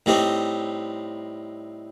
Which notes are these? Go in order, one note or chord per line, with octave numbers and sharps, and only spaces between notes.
A2 G3 C4 D#4